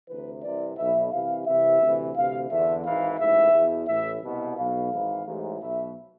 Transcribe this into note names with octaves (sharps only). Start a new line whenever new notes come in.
D2 C3 E3 B4
C2 C3 E3 D5
B1 B2 E5
C2 C3 E3 F5
C2 C3 E3 E5
D2 C3 E3
D2 C3 E3 F5
E2 D3 E5
G#1 G#2 E3 F5
A1 G#2 E3 E5
E2 B2
A1 A2 E3 E5
C2 B2
B1 B2 F5
G#1 G#2 E3
A1 G#2 E3
B1 B2 E5